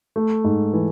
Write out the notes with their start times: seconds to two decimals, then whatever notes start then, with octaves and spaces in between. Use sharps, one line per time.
0.16 A3
0.44 G#2
0.73 E3